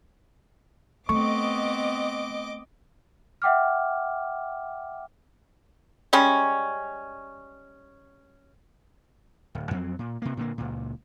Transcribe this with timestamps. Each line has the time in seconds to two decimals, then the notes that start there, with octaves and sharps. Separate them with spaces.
1.09 A3 B3 C4 D#5 C#6 D6
3.42 E5 F#5 G5 D6 F6
6.13 G3 G#3 C#4
9.55 D1
9.71 F2 F#3 C4
9.99 A#2
10.22 C3 A#3
10.37 A#2 D3 A#3
10.58 C#2 A#2